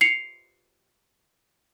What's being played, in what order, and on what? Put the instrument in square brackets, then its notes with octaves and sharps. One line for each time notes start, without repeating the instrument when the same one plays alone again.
[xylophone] C7 C#7 F7